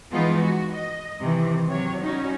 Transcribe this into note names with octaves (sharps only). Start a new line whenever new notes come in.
E3 F3 G#3 B3 D#4 F4
F#4
D#5
C3 D#3 E3
C3 F#3 C#5
G3 C#4 D#4 F#4